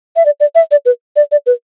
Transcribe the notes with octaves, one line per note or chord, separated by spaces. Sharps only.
E5
D5
D5
E5
D5
B4
D5
D5
B4